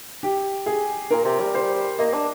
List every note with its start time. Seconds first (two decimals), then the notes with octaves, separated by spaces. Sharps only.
0.23 G4
0.66 G#4
1.11 A#2 A#4
1.25 C3
1.39 G3
1.55 C5
1.99 A#3 D#5
2.14 D4